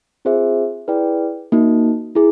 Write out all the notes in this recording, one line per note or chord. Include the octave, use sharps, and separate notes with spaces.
C4 F4 G#4 C5 E5
E4 G#4 B4 D5 G5
A#3 D#4 F#4
E4 G#4